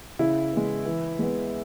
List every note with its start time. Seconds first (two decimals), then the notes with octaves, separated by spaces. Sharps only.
0.19 C#3 E4
0.52 G#3 B3
0.86 E3
1.19 G#3 B3